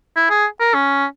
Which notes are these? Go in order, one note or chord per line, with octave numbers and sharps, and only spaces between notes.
E4
G#4
A#4
C#4